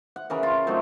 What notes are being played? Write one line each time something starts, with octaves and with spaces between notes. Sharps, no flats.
F#5
C#3 E3 A#4
F4
F#3 A3 C4 D#4